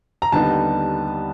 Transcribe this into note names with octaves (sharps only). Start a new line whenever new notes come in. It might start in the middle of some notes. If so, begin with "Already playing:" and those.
A#5
D#2 D3 G3 B3 D#4 A5